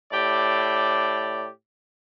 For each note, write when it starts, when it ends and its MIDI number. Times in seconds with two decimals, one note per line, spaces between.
0.12 1.48 45
0.12 1.48 67
0.12 1.48 74